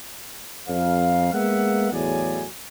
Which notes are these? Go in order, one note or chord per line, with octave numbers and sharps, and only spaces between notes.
F2 F5
G#3 A#3 B3 E5 F#5
E2 A2 F#3 G#4 D5 G#5